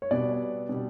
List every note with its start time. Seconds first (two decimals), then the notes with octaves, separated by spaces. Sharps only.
0.02 C#5
0.11 B2 G3 B3 D5
0.69 B2 G3 B3